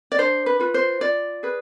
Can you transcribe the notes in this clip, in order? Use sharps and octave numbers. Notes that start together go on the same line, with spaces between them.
D5
D4 C5
B4
F4 B4
C5
F4 D5
G#4 B4